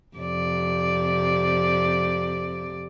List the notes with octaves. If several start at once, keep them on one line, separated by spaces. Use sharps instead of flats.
F2 C3 D5